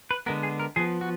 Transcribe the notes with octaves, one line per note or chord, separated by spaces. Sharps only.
B4
D3 G#3 B3 A#4
G#4
A#4
F3 B3 G#4
F#4